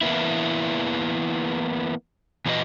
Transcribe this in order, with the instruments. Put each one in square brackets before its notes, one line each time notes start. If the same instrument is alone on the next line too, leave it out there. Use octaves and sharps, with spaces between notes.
[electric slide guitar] E3 A#3 B3 E4
A#2 E3 F#4 B4 C5 D#5